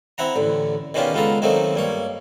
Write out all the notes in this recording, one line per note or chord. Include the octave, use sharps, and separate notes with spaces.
C4 E4 F#5 A#5
A1 D3
B2 D#3 C#4 D4 F4 G4
C#2 B3 F4 A4 A#5
D#3 F#3 A3 A#3 C4 D#4
G2 A#3 C#5